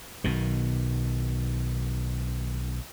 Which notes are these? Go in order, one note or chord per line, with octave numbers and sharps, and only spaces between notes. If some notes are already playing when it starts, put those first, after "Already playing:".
B1 B2 D#3